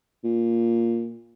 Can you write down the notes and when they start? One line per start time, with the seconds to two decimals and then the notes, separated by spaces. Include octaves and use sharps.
0.24 A#2